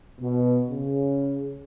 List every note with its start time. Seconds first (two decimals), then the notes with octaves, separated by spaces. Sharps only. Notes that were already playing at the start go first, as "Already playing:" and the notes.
0.20 B2
0.70 C#3